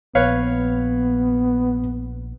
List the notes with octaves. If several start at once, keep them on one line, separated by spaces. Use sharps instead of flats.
A#1 B3 B4 C#5 F5